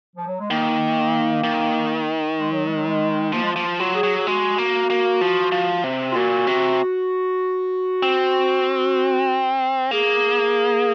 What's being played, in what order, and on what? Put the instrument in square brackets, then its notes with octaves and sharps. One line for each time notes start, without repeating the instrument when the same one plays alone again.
[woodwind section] F3
F#3
G#3
[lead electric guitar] D#3 [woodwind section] A#3
[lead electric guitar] D#3
[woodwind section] G#3
F#3
G#3
F#3
G#3
[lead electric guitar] F3 [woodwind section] A#3
[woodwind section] G#3
A#3
[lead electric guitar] F3
[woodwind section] F4
[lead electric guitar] F#3
[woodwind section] G#4
[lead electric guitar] F#3
[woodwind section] G#4
[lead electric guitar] G#3 [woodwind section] F#4
[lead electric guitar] A#3
A#3
F3
F3
C3
[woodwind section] F4
[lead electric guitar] A#2 [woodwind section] F#4
[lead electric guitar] C3
C4
[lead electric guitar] A#3 [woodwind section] G#4